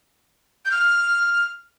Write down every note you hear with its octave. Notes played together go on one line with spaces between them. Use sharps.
G6
F6